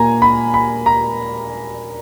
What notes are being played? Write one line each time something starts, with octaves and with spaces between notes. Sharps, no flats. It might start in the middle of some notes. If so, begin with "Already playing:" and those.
Already playing: A#2 A#3 G#5 A#5
B5
B5
A#5